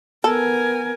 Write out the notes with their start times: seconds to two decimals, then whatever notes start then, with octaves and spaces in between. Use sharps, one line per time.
0.24 B3 A4 A#4 G#5